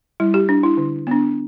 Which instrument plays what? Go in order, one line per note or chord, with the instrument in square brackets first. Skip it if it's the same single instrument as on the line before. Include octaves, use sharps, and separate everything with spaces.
[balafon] G3 E4
G4
D4
E4
D3
B3 D4